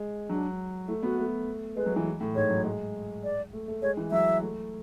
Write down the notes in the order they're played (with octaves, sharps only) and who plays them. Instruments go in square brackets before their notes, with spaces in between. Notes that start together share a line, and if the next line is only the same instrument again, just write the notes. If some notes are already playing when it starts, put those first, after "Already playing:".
Already playing: [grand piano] G#3
[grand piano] F#3 [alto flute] D4
[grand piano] A3 [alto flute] E4
[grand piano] B3 [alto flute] F#4
[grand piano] A3
[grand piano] G#3 [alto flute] B4
[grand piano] F#3
E3
A2
[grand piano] G#2 [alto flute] C#5
[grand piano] F#3
G#3
[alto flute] D5
[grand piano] A3
A3
[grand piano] G#3 [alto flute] C#5
[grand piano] E3
[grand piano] F#3 [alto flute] E5
[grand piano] A3